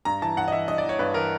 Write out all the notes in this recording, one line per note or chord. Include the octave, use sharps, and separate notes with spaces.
G2 A#5
E3 A5
G2 F#5
D#5
E3 E5
G2 D#5
D5
E3
C#5
G2 B4
E3 A#4